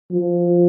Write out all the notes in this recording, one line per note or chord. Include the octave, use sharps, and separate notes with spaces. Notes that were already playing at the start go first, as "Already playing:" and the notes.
F3